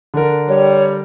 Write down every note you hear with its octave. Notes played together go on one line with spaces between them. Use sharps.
D3 D4 A#4
G3 C#5